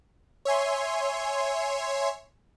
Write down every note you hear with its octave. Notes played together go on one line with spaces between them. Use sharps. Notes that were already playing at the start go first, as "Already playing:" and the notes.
C#5 E5 G#5 C6